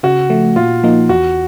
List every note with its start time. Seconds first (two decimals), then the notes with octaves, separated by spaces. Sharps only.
0.03 C#3 F#4
0.30 F3 A3
0.56 A#2 F4
0.84 F3 A#3 D#4
1.09 E2 F#4